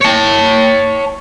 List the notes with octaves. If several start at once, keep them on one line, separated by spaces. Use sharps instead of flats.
C#5 A5